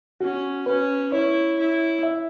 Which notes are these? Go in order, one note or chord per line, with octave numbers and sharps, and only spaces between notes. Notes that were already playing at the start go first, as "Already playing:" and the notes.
C#4 F#4
C#4 B4
E4 C#5
E4
E5